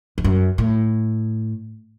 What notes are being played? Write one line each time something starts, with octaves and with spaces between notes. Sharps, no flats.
E2
F#2
A2